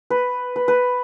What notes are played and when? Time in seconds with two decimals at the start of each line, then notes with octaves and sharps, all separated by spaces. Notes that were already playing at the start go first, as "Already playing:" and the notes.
0.10 B4
0.56 B4
0.68 B4